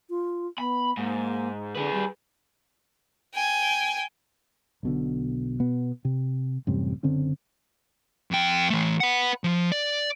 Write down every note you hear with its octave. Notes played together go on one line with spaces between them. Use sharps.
F4
B3 B5
G#2 A#3
D3 G#4 B4
G3
G5 G#5
B1 B2 D3
B2 B3
C3
A1 F#2 C3 G3
F#1 D3 C4 C#4
F2 G5
E3 A3
B4 F#5
F3
D5